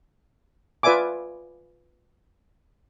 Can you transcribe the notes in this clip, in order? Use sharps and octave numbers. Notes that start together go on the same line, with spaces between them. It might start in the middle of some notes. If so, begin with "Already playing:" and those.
F4 B4 D5 E5 G#5 D6